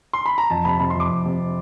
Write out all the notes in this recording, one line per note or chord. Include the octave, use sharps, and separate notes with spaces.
C6
B5
A#5
F2 A5
C3 B5
C3 B5
C6
F2
D6
F2
C3